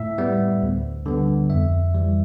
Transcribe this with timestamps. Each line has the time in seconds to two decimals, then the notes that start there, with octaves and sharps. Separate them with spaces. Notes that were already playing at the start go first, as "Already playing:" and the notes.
Already playing: A2 E5
0.18 G3 B3
0.62 D2
1.06 D3 G3 B3
1.50 F2 E5
1.95 E3 G3